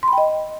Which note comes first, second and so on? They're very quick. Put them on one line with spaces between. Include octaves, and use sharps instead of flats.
C6 B5 G5 D#5